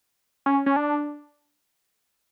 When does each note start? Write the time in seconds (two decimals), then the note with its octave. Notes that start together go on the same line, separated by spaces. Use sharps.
0.46 C#4
0.66 C#4
0.76 D4